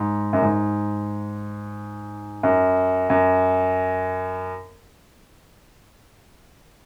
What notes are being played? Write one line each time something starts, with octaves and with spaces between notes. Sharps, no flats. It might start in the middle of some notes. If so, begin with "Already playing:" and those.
Already playing: G#2
F#2
G#2
F#2
F#2